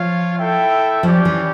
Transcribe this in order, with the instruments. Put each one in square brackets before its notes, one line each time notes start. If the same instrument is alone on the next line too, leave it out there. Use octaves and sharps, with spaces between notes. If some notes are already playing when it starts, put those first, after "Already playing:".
Already playing: [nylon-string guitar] F3 [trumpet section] F4 C#5 F5
[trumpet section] E4 A4 E5 G5
[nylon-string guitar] F3 [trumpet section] C#4 G4 D5
[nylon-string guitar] E3